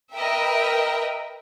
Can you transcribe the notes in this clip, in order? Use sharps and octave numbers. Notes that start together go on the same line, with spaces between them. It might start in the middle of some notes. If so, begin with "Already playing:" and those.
A#4 B4 D#5 E5 G5